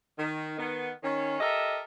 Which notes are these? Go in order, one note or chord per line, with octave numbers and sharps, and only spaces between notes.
D#3
D#3 B3
D#3 C#4
G4 A4 A#4 D#5 E5